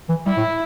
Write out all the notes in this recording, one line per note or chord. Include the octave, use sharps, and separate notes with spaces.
E3
G3 E4
A2